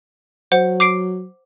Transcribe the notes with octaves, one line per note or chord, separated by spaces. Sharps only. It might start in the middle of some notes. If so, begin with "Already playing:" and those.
F#3 C5 F#5
D6 C7 D7